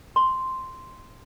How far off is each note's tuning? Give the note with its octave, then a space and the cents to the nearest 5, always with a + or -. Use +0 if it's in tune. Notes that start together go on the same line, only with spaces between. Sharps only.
C6 -5